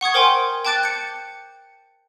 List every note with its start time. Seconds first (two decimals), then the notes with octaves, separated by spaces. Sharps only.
0.01 F#5 C#6 D#6 G#6
0.14 A#4 C5 G5 G#5 C6
0.65 G5 A5 D6 F#6 A6 D7
0.83 G6 C#7